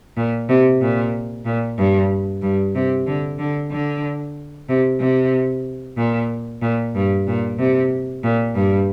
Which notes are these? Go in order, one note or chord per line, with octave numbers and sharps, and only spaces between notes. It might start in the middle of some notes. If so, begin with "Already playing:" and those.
A#2
C3
A#2
A#2
G2
G2
C3
D3
D3
D3
C3
C3
A#2
A#2
G2
A#2
C3
A#2
G2